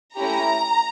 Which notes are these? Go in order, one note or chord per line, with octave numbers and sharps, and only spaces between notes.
A3 C#4 E4 G4 A#5